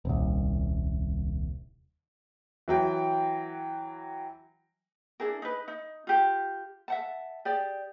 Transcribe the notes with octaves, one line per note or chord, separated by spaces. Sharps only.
D#1 C2
E3 F#3 G5
D4 E4 G#4 A#4
D#4 B4
D#4
F4 G4
E5 F#5 A5
G4 G#4 D5